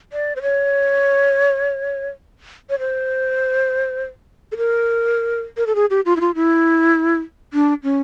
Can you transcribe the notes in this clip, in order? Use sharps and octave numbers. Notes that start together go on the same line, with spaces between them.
D5
C5
C#5
C#5
C5
A4
A#4
A#4
A4
G#4
G4
F4
E4
F4
E4
D4
C#4